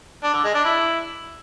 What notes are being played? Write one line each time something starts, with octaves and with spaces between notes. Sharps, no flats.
D4
D3
G#3
D4
E4